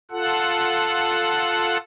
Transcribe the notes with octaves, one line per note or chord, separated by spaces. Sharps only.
F4 A4 F#5